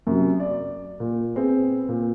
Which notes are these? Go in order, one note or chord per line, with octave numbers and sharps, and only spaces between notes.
F#2 C3 F#3
D5
A#2
B3 C4 G#4
A#2